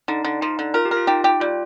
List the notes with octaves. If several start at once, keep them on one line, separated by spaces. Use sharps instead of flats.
D3 D#4
D3
F3 D#4
D3
F4 A#4
G4
A#4
F4
D#4 G4
G4
G3 F4